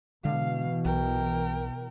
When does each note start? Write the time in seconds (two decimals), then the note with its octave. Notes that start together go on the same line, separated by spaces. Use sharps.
0.25 B2 D3 E3 G#3 F5
0.85 B1 A#4 G5